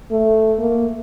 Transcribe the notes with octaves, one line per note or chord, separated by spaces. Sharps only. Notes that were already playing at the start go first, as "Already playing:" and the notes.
A3
A#3